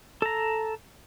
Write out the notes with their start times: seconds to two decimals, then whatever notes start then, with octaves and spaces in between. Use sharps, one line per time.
0.22 A4 A#5